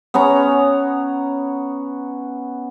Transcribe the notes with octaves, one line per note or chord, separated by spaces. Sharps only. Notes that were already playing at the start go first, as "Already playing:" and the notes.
B3 C#4 C#5 A#5